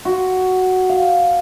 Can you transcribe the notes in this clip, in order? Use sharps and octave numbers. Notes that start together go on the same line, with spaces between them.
F#4
F5